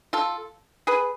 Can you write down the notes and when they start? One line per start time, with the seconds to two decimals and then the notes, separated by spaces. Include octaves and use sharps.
0.13 F4 A4
0.87 G#4 B4